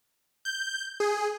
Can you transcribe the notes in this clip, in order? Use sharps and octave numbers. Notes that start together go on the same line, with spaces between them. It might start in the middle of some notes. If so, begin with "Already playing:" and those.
G6
G#4